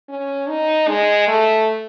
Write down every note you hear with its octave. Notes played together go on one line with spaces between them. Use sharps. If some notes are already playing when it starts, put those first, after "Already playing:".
C#4
D#4
G#3
A3